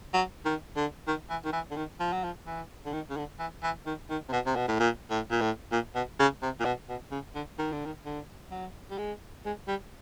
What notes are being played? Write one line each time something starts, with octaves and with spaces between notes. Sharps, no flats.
F#3
D#3
D3
D#3
E3
D#3
E3
D3
D#3
F3
F#3
F3
E3
D3
D#3
C#3
D3
E3
E3
D#3
D#3
C3
B2
C3
B2
A2
A#2
A2
A#2
A2
A#2
B2
C#3
C3
A#2
B2
B2
C#3
D3
D#3
D3
D#3
D3
F#3
G3
G#3
G#3
G3